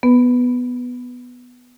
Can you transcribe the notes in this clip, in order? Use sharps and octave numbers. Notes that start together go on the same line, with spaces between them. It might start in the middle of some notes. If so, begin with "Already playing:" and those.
B3 B4